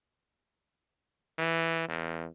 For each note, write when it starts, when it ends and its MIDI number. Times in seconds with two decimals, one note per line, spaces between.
1.38 1.88 52
1.88 2.28 40